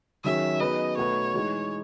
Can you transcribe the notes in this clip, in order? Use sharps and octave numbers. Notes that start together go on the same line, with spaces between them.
D#3 F#3 C#4 G#4 E5
F#3 B3 D#4 G#4 B4 D#5
B2 A3 D#4 F#4 B4 C#5
E3 G#3 D#4